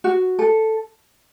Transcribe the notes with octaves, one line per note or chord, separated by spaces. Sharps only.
F#4
A4